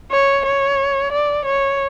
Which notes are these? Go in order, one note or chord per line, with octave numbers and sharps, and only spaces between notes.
C#5
C#5
D5
C#5